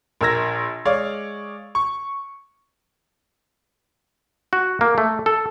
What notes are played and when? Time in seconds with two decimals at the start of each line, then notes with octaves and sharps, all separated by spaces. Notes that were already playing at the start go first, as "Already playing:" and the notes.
0.21 A#1 A#4 E6 G#6 A#6
0.85 G#3 C#5 D5 F5
1.75 C#6
4.53 F#4
4.81 A#3
4.98 A3
5.26 A4